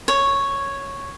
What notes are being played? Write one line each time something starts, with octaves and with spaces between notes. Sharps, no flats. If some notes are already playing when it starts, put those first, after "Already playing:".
C#5